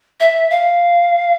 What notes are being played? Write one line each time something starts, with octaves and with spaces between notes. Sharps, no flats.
E5
F5